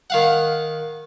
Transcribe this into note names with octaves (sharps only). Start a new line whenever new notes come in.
D#3 F5 F#5